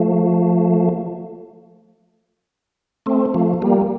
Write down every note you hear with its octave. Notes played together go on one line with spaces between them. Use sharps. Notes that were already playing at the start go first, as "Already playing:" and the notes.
Already playing: F3 A3
A3 C4
F3 A3
G3 A#3